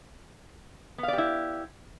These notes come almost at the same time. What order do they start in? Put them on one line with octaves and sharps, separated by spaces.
B3 F5 D5 G4 E4